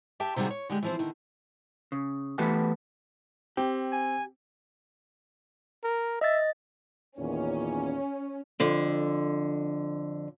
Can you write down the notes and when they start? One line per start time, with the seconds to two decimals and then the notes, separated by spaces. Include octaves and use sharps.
0.20 G4 E5 G5 A5
0.36 C3 D#3 G3 D4 F#4 G#4
0.50 C#5
0.69 D3 G#3 G4
0.82 E3 F3 C4
0.99 D3 D#3
1.92 C#3
2.38 E3 A3 B3 F#4 G4
3.57 C4 G4
3.92 G#5
5.84 A#4
6.21 D#5 E5 A6
7.19 E2 A#2 D#3 C#4
8.60 F2 D3